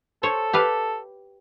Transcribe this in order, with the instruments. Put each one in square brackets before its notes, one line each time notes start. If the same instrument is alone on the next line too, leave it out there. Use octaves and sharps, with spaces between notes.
[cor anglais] A4 [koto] C5 C#5
[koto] G4 B4 F5